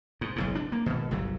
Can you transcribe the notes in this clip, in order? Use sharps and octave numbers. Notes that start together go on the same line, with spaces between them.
G#2
F#1 B1 G#2
D4
A#3
G#1 B2
G1 C2 D3 F#3